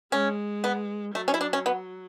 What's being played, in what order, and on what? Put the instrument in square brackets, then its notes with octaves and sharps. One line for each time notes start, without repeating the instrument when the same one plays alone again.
[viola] G#3 [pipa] C#4
[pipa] B3
[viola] F#3 [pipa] A3
[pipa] C#4
E4
D4
C#4
B3